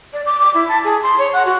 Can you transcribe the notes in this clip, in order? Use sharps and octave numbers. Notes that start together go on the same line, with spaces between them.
D5
D6
D6
E4
A5
G#4
C6
C#5
F#5
F#4